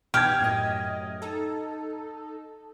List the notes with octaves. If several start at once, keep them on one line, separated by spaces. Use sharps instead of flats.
B2 G4 F6 G#6
F#2 A2 D#5
D#4 A4